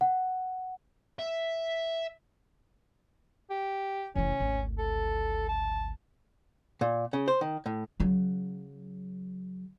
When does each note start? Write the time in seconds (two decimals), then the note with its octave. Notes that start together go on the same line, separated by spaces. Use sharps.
0.01 F#5
1.19 E5
3.50 G4
4.16 F1 E3 C#4
4.40 G#1 D2
4.78 A4
5.48 A5
6.81 A#2
7.13 C#3
7.28 C5
7.41 D#3
7.66 A2
8.00 C#3 F#3